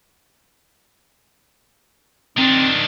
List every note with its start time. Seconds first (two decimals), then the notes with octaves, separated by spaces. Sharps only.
2.37 D#3 C4 D4